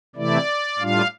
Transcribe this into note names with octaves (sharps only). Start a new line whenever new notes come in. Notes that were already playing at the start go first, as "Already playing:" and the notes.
C3 E3 A3 E4 D5
A2 G3 D4 F4 F5